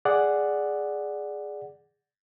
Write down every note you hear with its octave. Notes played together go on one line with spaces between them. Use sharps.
G#4 D5 F#5